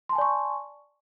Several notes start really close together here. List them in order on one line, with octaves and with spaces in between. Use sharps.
C6 A5 G#5 D5 C#6